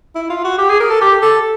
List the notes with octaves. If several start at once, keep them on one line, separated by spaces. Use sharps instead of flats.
E4
F4
F#4
G4
G#4
A#4
A4
G4
A4